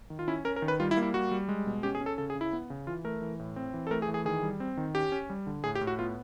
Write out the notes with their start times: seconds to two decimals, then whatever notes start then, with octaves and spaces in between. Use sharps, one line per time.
0.10 D#3
0.19 F4
0.28 C#4 E4
0.45 C#4 A#4
0.56 A#4
0.62 D#3
0.68 B4
0.80 G3 F4
0.91 E4
0.97 A#3
1.03 E4
1.14 G3 F#4
1.31 G3
1.49 G#3
1.66 B2
1.83 C#4 G4
1.95 G#4
2.00 C#4
2.06 A4
2.18 C#3 A4
2.30 G#4
2.35 C#3
2.41 E4
2.53 B3
2.70 C#3
2.87 E3 F4
3.04 A3 A#4
3.22 E3
3.39 A2
3.56 C4
3.74 E3
3.87 A4
3.91 A3 A#4
4.02 G#4
4.08 E3
4.14 G#4
4.25 D#3 G#4
4.43 G3
4.60 C4
4.77 D#3
4.95 C#4 G4
5.12 C#4
5.30 G3
5.47 D3
5.64 A2 G#4
5.75 G4
5.81 A2
5.87 F#4
5.99 B3 F4